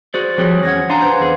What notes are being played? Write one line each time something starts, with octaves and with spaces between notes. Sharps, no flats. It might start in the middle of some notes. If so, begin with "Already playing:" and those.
F#4 G#4 C5 D5
F3 G3 C4 F#4 G#4 C#5
E2 C#4 F#5 G#6 A#6
D4 F5 F#5 G#5 A#5 C6
B4 C5 G6
E2 G#4